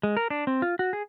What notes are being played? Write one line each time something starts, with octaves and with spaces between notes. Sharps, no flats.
G#3
A#4
D4
C4
F4
F#4
G#4